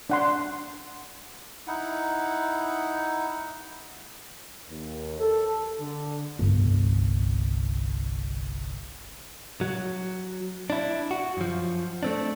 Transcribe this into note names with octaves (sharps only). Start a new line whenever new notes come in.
D4 F#5 C6
D#4 E4 F#5
D#2
A4
D3
G1 C2
F#3
D4 E4
F#4
F#2 F3
A3 C4 D4